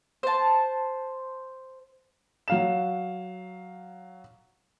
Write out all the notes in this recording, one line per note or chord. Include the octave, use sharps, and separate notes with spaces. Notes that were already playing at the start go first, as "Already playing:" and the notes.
C5 A5
F#3 F5 E7